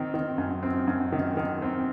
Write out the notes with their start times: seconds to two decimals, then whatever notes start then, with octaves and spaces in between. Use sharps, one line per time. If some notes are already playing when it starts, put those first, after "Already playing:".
Already playing: D#3 C4
0.14 D#3
0.38 F#2
0.63 C4
0.88 F#2
1.12 D#3
1.37 D#3
1.62 C4